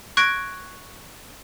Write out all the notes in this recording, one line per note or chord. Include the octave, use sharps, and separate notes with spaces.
C#6 F#6 G#6 A#6 D7